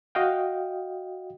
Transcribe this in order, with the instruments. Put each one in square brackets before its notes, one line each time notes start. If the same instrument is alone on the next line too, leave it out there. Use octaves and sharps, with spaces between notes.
[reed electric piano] F#4 D#5 F5 G5